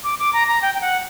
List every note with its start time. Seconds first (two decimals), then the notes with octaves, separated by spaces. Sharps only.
0.04 D6
0.19 D6
0.33 A#5
0.48 A#5
0.62 G5
0.75 G5
0.81 F#5